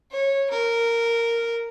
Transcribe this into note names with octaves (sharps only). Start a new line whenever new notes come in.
C#5
A#4